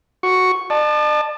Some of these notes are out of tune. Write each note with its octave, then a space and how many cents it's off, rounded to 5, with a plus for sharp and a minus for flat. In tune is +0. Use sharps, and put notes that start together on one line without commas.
F#4 +0 C#6 +0
D5 +45 A5 +0